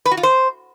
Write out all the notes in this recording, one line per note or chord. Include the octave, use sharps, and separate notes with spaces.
B4
F#4
F4
C5